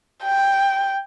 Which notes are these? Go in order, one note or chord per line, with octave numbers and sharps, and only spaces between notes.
G5